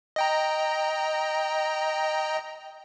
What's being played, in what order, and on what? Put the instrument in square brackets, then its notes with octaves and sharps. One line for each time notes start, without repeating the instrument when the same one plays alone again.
[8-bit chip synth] D#5 G5 A#5